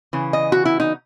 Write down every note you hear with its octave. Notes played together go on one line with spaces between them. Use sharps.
C#3 E3
D#5
F#4
E4
D#4